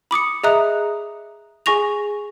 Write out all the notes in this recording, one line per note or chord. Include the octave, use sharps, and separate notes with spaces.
B5 D6 D#6 C#7
G#4 D#5 E5 A#5 D#6 F#6
G#4 G#5 C#6 A#6 F7